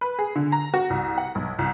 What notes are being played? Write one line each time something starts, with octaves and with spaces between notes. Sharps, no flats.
B4
G#4
D3
A#5
F#4
C2
F#5
B1
C2